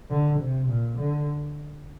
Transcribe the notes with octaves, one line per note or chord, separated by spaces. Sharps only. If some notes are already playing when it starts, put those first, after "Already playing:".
D3
C3
A#2
D3